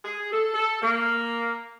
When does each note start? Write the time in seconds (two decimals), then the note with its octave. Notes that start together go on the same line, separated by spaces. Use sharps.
0.04 G#4
0.32 A4
0.54 A4
0.82 A#3